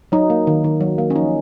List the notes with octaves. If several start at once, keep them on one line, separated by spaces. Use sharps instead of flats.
F#3 D#4
A#3
D#3
D#3
F#3
A#3
C#4
F3 D#4